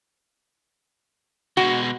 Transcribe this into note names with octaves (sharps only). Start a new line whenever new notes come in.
B2 G#3 F#4